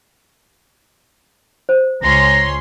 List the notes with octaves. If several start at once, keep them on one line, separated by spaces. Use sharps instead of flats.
C5
C#2 C#4 A#5 C6